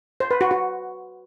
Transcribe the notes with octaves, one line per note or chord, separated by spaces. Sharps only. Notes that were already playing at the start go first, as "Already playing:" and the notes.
C5
B4
F#4
F#4